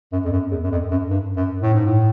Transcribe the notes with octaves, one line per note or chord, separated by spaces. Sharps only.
F#2
F2
F#2
E2
F#2
F2
F#2
G2
F#2
A2
G#2
A2